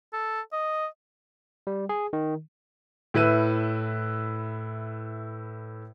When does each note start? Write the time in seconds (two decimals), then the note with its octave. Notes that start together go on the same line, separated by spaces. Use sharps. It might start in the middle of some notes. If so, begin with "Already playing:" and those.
0.13 A4
0.53 D#5
1.67 G3
1.89 G#4
2.13 D#3
3.14 A2 E4 B4 D#7